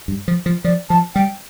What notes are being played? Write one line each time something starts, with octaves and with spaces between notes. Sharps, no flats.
G2
F3
F3
F3 D5
F3 A5
G3 G5